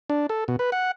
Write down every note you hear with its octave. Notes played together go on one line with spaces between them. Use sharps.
D4
A4
B2
B4
F#5